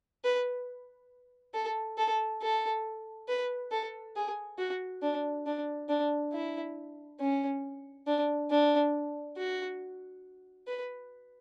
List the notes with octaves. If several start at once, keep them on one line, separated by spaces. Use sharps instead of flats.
B4
A4
A4
A4
B4
A4
G#4
F#4
D4
D4
D4
E4
C#4
D4
D4
F#4
B4